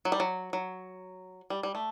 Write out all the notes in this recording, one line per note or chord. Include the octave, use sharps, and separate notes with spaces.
F#3
G3
F#3
F#3
G3
G3
A3